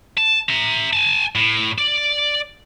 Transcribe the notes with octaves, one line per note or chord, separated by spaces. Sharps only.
A5
E5 A#5
G#5 A5
A2
D5